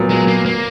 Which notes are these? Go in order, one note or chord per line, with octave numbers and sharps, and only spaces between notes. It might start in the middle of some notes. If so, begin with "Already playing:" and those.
Already playing: A#2 F#3 B3
G#3
A#3
A#3